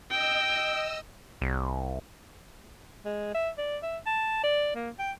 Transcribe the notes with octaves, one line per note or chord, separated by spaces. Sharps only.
D#5 G5 E6
C2
G#3
E5
D5
E5
A5
D5
A#3
G5